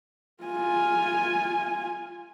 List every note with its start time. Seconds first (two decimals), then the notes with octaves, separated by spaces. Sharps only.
0.43 F4 G#5